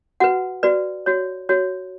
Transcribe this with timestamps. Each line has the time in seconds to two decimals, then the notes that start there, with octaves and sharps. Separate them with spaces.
0.20 F#4 B4 F#5
0.63 F#4 B4 D5
1.06 F#4 C#5
1.49 F#4 C#5